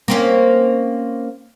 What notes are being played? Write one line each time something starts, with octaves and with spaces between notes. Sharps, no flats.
A#3 C4 C#4